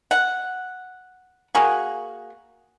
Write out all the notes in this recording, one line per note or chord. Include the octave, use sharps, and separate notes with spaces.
F#5
A#3 F#4 G#4